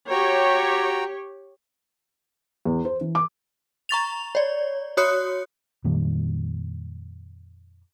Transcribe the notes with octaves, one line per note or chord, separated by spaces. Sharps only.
F#4 G4 C#5 G5 A#5
E2
C5
E3
D6
A#5 C#6 A6 F7
C#5 D5
F#4 C#5 D#6 F#6 C#7
F2 A#2 D#3 G3